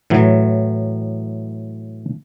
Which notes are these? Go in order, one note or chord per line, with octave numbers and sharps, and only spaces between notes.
A2 E3 F#3